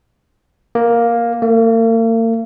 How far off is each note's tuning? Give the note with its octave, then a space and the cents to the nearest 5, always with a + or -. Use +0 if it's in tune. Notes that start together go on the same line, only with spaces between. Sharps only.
A#3 +5
A#3 -45